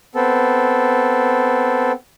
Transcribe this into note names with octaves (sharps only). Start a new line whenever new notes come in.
B3 C4 A4